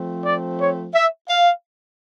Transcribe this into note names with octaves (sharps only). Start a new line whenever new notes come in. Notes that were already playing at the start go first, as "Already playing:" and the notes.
Already playing: F3 A3 C4
D5
C#5
E5
F5